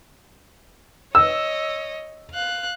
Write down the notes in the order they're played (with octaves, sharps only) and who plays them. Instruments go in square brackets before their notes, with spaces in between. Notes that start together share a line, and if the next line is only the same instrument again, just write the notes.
[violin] C#5 D#5 [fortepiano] E6
[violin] F5 F#6